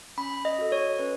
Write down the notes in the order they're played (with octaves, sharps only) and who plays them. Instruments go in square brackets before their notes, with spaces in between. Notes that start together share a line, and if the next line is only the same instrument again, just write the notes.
[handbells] C#4 B5
D#5
F#4 A4
C#5
C#4 B4